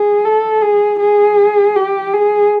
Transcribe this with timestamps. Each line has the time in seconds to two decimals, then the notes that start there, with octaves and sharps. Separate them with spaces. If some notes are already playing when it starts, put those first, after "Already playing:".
Already playing: G#4
0.25 A4
0.62 G#4
1.00 G#4
1.76 G4
2.13 G#4